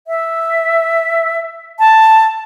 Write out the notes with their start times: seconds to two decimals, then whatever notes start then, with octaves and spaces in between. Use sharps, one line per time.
0.07 E5
1.79 A5